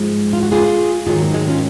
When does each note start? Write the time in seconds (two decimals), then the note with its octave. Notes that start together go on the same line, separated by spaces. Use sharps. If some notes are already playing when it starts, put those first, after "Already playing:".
Already playing: G#2 F3 G#3
0.33 F4
0.43 F#4
0.52 F4 G#4
1.07 G#2 D#3 F#3 F4 G#4
1.21 A#3
1.34 G#3
1.48 C#4 F4